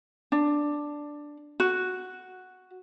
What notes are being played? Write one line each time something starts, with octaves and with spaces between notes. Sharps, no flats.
D4
F#4